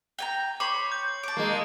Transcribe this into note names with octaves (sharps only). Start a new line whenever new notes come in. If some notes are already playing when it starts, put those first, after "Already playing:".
G5 G#5 A#5
C#5 B5 C6 D6
G6
A5 D6
G#3 A#3